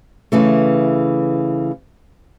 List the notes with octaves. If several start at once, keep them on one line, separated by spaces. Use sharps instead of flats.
C#3 E3 A3